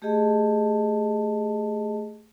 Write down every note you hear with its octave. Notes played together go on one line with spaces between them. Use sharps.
A3 G4 G#4 D#5 A5